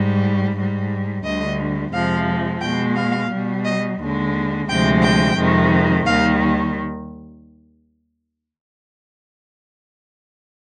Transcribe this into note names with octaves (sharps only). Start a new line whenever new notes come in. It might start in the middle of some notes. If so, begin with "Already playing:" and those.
Already playing: G#2 G3
G#2 G3
D2 D3 G3 D#5
F2 C3 F3 G#3 F5
B2 G#3 G5
F5
B2 G3
D#5
D#2 D3 G#3
D2 C3 F3 G#3 G5
G5
F2 C3 D#3 G#3
D#2 D#3 G3 F5